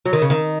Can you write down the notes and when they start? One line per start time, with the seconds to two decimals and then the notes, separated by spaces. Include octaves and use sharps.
0.06 F#3
0.13 D#3
0.22 C#3
0.30 D#3